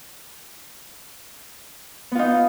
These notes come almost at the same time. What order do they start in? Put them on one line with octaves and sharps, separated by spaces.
B3 F4 D#4